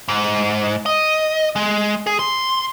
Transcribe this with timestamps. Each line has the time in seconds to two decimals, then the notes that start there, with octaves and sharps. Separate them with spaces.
0.09 G#2
0.86 D#5
1.56 G#3
2.07 G#4
2.19 C6